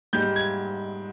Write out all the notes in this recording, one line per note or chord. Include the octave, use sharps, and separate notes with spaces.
G#2 G3 G6
G#6